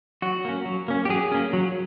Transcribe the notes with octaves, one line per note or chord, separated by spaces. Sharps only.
F#3 F#4
A#3 C#4
F#3
A#3 C#4
G4
F#3 G#4
A#3 C#4
F#3